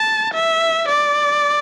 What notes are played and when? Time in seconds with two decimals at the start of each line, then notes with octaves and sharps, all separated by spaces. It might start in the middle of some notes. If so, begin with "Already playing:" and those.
Already playing: A5
0.34 E5
0.88 D5